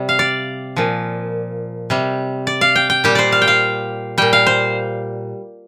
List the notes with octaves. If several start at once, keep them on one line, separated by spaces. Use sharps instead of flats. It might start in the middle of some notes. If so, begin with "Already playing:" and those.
Already playing: C3 G3
F5
D5
A#2 F3
C3 G3
D5
F5
G5
G5
A#2 G3 G4
C5 D5
F5
G5
F5
A#2 G3 G5
F5
C5